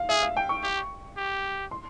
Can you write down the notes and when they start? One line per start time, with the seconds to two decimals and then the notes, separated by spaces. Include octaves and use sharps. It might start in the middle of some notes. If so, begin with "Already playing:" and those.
Already playing: F5
0.09 G#4 E5
0.23 F5
0.37 G5
0.49 C#6
0.63 G4
1.17 G4
1.71 C6